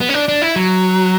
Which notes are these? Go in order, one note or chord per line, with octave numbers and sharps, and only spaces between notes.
B3
C#4
D4
D4
E4
F#3